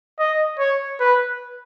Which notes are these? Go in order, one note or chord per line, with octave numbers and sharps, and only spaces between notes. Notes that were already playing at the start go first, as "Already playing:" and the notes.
D#5
C#5
B4